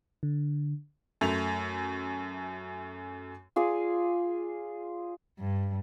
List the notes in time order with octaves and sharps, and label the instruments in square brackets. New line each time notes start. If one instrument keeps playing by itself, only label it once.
[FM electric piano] D3
[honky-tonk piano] F#2 A3 F7
[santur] F4 G#4 D5
[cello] G2